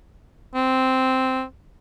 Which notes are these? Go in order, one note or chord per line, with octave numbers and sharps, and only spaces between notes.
C4